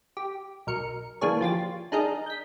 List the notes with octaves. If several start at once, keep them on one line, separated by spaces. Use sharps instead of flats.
G4
B1 A#4 C#7
E3 A#3 D4 G#4 C#5
F3 F4 G4 A6
D4 D#4 G#4 A#4 D#5
G6 B6